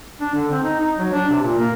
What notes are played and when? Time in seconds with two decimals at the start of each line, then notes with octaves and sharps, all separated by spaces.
0.21 D4
0.35 D3
0.51 C4
0.63 D#4
0.80 D#4
0.98 F#3
1.13 D4
1.30 C3
1.42 A#2
1.58 A#3